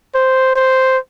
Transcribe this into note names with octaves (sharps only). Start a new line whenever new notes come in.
C5
C5